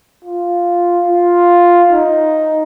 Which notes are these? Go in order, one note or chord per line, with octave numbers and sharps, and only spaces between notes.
F4
F4
D#4